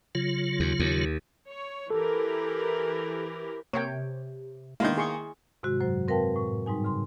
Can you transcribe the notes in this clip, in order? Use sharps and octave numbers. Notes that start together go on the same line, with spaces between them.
C#3 F#3 F4
D#2
D#2
C#5
E3 G4 A4 A#4
C3 A#3 C4 A#4 C#5 G5
D#3 G#3 A#3 B3 D4 E4 C6
G#4 C6 C#6
G#2 C3 D#3 G#3 F#4
F#2 F#3 C5
C4 A#4 B4 F5 G5 A5
A2
G#2 G3 D#4 G#5
C#3 C6